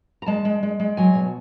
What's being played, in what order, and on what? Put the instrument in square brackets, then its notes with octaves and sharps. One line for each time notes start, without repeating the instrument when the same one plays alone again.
[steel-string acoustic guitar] A#5
G#3 A5
G#3
G#3
G#3
F#3 G#5
B2